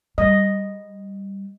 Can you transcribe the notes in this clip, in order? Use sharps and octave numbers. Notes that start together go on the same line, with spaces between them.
G3 D#5